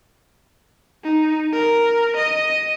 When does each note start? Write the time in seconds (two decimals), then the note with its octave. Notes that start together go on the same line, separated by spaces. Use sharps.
1.04 D#4
1.53 A#4
2.16 D#5